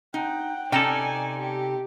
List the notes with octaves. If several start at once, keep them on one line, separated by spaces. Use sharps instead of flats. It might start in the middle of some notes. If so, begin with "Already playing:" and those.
D#4 F#5 G5
C3 C#4 D#4 A4 D5 G5 G#5
G4